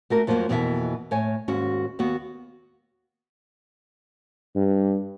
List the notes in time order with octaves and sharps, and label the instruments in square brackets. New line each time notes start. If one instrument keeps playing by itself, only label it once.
[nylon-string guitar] A3 F#4 A#4
F2 F3 F#3 G#3 A#3
F2 B2 E3 A#3 E5
A2 C#5 G#5
D#2 G#2 C#4 F#4
D#2 B3 F#4
[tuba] G2